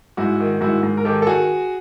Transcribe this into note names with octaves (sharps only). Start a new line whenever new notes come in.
G#2 E4 F#4
D#3
G#2 E4 F#4
G#2
A#4
D#3 G4 A4
A4
F#4 G#4